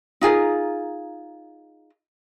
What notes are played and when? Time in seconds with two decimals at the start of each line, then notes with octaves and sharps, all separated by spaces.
0.21 D#4 F4 G#4 A#4